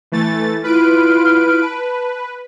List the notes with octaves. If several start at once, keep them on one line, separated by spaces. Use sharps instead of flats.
E3 A3 A6
E4 F4 B4 F6 D7
B4 A5